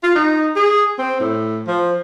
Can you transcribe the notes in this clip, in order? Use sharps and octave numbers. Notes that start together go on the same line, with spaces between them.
F4
D#4
G#4
C4
A2
F3